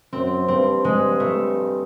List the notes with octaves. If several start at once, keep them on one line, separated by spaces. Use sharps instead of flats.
F#2 C4
G2 C4
G2 G#3
A3